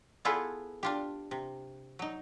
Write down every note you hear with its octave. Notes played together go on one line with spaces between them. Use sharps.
B3 E4 F4 G#4 A4 B4
D4 F4 G4
C3
F#3 D#4